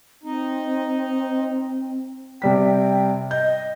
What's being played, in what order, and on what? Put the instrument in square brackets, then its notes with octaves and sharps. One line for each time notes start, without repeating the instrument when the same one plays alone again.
[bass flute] C4 [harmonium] D#4
[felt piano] C3 G3 B6 [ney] G5
[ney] D#5 [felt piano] G6